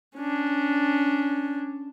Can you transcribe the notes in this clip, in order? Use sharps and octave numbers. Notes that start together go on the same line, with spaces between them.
C#4 D4